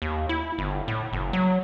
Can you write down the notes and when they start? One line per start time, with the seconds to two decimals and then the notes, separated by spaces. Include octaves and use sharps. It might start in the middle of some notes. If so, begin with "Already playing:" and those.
0.02 D#2
0.29 E4
0.58 G1
0.88 A2
1.13 F#1
1.33 F#3